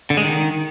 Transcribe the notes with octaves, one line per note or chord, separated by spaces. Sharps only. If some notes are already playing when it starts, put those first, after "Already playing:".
D3
G#3
D#3